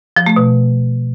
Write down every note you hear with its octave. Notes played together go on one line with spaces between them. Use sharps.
F3
A3
B2